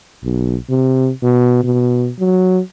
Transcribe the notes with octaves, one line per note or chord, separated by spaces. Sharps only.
B1
C3
B2
B2
F#3